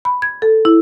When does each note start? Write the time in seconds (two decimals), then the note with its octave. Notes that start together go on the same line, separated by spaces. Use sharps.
0.05 B5
0.22 G#6
0.42 A4
0.65 E4